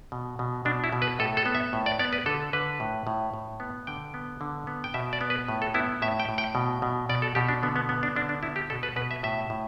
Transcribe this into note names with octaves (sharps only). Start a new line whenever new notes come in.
B2
B2
B2 D4
E4
B2
B4
A2 A4
A4
B3
E5
A2
D5
B3 D5
B4
D3 A4
D3 B4
A2
A2
A2
B3
D3 G5
B3
D3
B3
G5
B2 E5
D5
B3
B4
A2
A4
B3 E4
A2 E5
G5
A2
G5
B2
B2
B2 D5
A4
B2 G4
D4
D3 B3
B3
B3
D4
D3 D4
D4
B3 E4
G4
B2 A4
B4
B2 B4
E5
A2 E5
A2